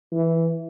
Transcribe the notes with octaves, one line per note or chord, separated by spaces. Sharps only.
E3